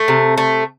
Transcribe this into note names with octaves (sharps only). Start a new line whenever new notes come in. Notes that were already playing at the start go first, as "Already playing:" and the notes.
Already playing: A3
C3
A3